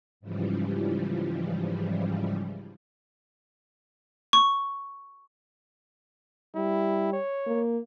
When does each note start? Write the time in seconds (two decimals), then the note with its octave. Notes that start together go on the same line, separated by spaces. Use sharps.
0.20 G#2 C#3 E3 F3 G3
4.33 C#6
6.56 G3 E4
7.13 C#5
7.47 A#3